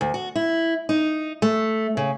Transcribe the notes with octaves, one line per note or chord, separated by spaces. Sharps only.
D2
F#4
E4
D#4
A3
C#3